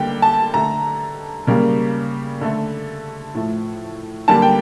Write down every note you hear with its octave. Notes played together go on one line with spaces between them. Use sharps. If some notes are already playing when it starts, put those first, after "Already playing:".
Already playing: D3 G3 A#3 G5
A5
D3 A3 A#5
C#3 G3 A#3
D3 A3
A2 F3 A3
D3 G3 A#3 A5
G5